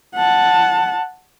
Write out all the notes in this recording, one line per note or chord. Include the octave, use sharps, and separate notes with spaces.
F#5 A5